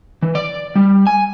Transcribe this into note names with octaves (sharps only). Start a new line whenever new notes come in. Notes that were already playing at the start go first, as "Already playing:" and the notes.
E3
D5
G3
G#5